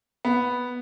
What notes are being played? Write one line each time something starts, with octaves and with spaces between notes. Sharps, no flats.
B3